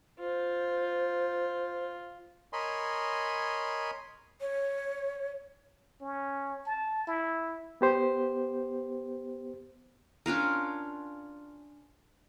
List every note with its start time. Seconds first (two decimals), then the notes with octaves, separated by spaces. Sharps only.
0.19 F4 C5
2.53 A#4 C#5 D#5 G#5 B5 C6
4.41 C#5
6.01 C#4
6.66 A5
7.07 E4
7.81 B3 G4 C5
10.26 C#4 D4 F4 A#4